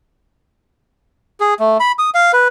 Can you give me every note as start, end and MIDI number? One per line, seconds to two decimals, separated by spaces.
1.40 1.54 68
1.60 1.78 57
1.80 1.92 83
1.99 2.10 87
2.14 2.32 77
2.33 2.48 71